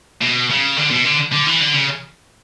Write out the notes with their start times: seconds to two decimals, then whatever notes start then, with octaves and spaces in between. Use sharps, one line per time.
0.22 B2
0.50 C#3
0.77 D3
0.91 B2
1.05 D3
1.32 D3
1.46 E3
1.60 D3
1.73 C#3